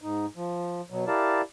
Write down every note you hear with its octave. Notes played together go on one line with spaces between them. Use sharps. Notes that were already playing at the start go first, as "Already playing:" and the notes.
G#2 D#4
F3
B2 F#3
E4 G4 A#4 D5 F5 A5